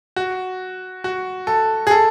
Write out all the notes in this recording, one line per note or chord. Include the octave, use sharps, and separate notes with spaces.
F#4
F#4
A4
G#4
A4